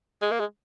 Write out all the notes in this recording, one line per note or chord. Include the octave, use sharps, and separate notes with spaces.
G#3
A#3
G#3